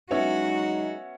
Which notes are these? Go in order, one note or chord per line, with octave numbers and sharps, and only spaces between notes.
F#3 G#3 B3 C#4 D#4 E4 F#4